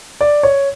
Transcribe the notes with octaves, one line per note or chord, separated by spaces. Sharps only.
D5
C#5